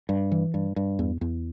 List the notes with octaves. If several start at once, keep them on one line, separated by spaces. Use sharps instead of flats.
G2
E3
G2
G2
E2
E2